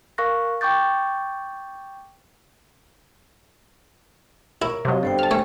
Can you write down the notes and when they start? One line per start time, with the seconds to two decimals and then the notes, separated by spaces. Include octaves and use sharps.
0.18 A#4 F5 C#6 F#6 A#6
0.61 G5 C#6 D6 G6 A6
4.62 E4 A#4 C#5 C#6
4.85 C3 F#3 D#5 F5
5.03 G1 G2 A4 C5 G5
5.19 A5 F6
5.31 A3 C#4